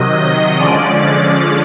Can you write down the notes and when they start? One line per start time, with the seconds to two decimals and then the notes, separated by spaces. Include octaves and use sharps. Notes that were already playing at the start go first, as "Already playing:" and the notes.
Already playing: C3 D#3 F#3 D#5
0.59 D3 F3 G#3 C#4 D5